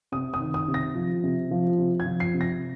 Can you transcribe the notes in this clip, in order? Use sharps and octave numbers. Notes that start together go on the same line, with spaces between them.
C3 D#6
D#6
D#3
D#6
C3
A#6
F3
C3
F3
C3
G#6
F3
C7
C3
A#6